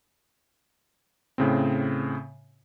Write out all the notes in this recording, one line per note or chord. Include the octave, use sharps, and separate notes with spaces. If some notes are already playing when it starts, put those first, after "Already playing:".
A2 C#3 C4